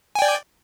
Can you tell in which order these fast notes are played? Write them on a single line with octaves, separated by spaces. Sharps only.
G#5 G5 D5